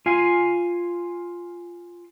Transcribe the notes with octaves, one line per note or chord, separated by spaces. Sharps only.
F4 F5 G#5